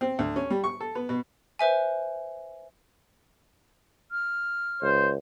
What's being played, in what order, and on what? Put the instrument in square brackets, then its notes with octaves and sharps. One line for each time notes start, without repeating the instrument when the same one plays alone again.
[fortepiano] C4
D2
C#4
G3
C#6
A4
B3
B2
[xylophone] B4 C5 E5 G#5
[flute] F6
[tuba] C#2 [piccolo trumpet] C5